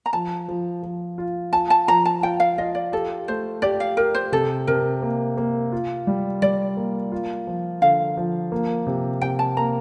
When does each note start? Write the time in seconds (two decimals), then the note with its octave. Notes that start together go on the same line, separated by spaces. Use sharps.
0.06 A#5
0.13 F3 A5
0.48 F3
0.83 F3
1.18 F4
1.53 F4 A5
1.70 A5
1.88 F3 A#5
2.05 A5
2.23 F4 G5
2.40 F5
2.58 F4 D#5
2.75 D5
2.92 G4 A4
3.28 A3 C5
3.62 G4 D5
3.80 F5
3.97 G4 A#4
4.15 C5
4.32 C3 A4
4.67 C3 A#4
5.02 A#3
5.37 A#3
5.72 F4
6.07 G3
6.42 G3 D5
6.77 A#3
7.12 F4
7.47 F3
7.82 D3 F5
8.17 F3
8.52 A#3
8.87 C3
9.21 C3 G5
9.39 A5
9.57 A#3 A#5